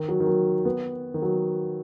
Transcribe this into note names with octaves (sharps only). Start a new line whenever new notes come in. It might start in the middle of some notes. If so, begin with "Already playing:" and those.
Already playing: D#3
F#3
D#3
F#3
B3
D#3
F#3